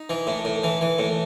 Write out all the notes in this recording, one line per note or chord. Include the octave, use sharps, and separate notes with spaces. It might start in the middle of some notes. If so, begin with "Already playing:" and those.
Already playing: D#4
E3
A2
A2
E3
E3
A2